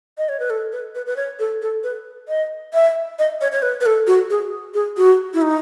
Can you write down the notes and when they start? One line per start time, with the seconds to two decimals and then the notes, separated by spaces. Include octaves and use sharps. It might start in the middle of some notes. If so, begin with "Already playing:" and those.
0.18 D#5
0.29 C#5
0.40 B4
0.50 A4
0.72 B4
0.95 B4
1.06 B4
1.16 C#5
1.39 A4
1.62 A4
1.84 B4
2.28 D#5
2.74 E5
3.19 D#5
3.41 C#5
3.52 C#5
3.62 B4
3.81 B4
3.86 A4
4.07 F#4
4.30 G#4
4.74 G#4
4.97 F#4
5.34 E4
5.42 D#4